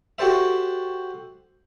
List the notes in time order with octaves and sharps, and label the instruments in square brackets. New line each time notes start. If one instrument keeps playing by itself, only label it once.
[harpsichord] F#4 G4 A4 C5 E5